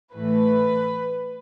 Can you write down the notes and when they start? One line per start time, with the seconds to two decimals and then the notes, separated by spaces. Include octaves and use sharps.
0.15 A2 E3 A3 B4